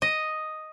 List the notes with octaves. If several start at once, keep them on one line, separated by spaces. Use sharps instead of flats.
D#5